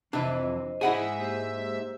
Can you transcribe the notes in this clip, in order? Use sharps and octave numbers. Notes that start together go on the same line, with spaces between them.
F2 C3 E3 D4 C5 D#5
G#2 D#4 E4 G#4 E5 F#5 G#5
A#3 G4 C5